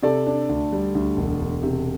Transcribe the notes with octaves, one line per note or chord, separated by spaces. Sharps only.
C3 A4 D5
D4
D2
G3
D2
E1
E1
C3